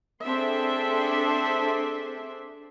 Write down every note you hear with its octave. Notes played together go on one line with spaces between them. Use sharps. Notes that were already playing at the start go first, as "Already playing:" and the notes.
C4 D4 G#4 A4 E5 C6